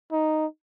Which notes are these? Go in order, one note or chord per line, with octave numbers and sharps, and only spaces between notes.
D#4